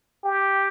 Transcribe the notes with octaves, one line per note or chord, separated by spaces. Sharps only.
G4